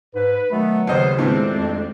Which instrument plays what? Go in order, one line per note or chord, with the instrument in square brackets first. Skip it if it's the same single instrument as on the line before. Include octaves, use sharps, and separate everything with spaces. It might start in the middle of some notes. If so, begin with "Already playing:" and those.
[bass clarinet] G#2 [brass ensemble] B4
[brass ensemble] D#3 F#3 B3 [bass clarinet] A3
[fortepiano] D#2 D#5 [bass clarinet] C#3 [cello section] C5
[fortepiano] D#2 A2 B3 [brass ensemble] F3 A3 D4 [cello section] G#3 C4
[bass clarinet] F2